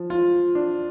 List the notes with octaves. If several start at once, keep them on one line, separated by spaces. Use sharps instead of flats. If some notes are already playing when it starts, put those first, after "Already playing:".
Already playing: F3
F4
D4